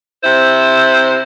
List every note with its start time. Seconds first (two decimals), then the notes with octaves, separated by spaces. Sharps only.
0.24 C3 E4 C5